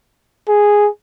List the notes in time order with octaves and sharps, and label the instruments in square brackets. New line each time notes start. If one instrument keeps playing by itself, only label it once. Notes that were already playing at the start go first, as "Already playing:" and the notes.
[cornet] G#4